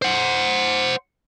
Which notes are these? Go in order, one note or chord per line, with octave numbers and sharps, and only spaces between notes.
C5 F#5